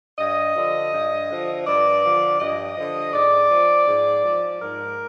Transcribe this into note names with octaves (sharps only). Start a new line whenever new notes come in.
G2 D#5
D3 F3
G2
D3 F3
G2 D5
D3 F3
G2 D#5
D3 F3
G#2 D5
F3
G#2
F3
G#2 A#4